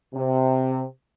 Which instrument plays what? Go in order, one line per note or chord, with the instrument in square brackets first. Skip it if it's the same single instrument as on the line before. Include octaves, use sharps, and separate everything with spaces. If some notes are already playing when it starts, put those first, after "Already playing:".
[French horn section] C3